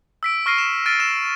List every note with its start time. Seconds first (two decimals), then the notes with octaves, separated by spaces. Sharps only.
0.23 E6 B6 D7
0.46 C#6 F6 A#6 C7 D#7
0.58 E7
0.86 F6 A6 D7 D#7
1.00 E6 E7